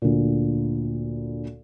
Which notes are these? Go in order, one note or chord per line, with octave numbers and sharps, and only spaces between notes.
D2 A#2